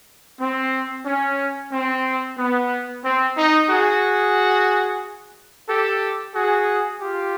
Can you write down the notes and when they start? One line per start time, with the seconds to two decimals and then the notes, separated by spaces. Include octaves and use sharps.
0.40 C4
1.06 C#4
1.72 C4
2.38 B3
3.04 C4
3.37 D#4
3.70 F#4 G#4
5.68 G4 A4
6.34 F#4 G#4
7.01 F4 G4